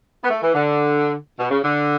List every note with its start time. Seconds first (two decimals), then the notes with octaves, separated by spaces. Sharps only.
0.24 B3
0.30 A3
0.43 E3
0.55 D3
1.39 B2
1.51 C#3
1.64 D3